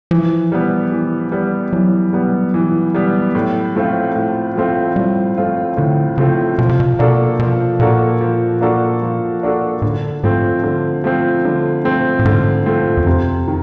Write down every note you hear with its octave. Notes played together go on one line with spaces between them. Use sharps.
E3 F3
G3 B3
E3
G3 B3
E3 F#3
G3 B3
E3
G3 B3
A2
F3 A3 C4 F4
A2
F3 A3 C4 F4
A2 G3
F3 A3 C4 F4
A2 D3
C#3 F3 A3 C4 F4
B2 F3
C3
B2
B2 A#3 D4 F#4 A4
B2 F3
A#2 A#3 D4 F#4 A4
F3
A#3 D4 F#4 A4
F3
A#3 D4 F#4 A4
A2 D3
G#2 F3 A3 C4
D3
F3 A3 C4
D3
F3 A3 C4
A2
G#2 D3
F3 A3 C4
E2
F2 C3
D#3